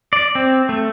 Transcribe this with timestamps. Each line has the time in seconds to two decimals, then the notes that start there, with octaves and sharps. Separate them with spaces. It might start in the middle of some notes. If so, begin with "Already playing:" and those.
0.13 D5
0.35 C4
0.69 A3